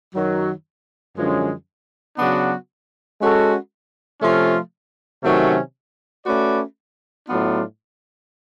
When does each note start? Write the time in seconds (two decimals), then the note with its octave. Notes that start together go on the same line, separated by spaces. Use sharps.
0.14 F#2 D#3 F#3
1.16 F#2 D3 F3 G#3 C#4
2.18 C#3 F#3 B3 D4 F#4
3.20 G#3 C#4 F#4 A4
4.21 C3 F3 A3 C#4 F4
5.23 C3 D#3 F#3 A3 C#4
6.24 A3 C#4 F#4 B4 D5
7.27 A2 F#3 B3 D4 F4